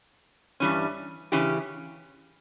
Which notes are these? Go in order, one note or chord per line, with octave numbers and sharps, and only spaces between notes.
G2 E3 G3 C#4
C#3 E3 C#4 G4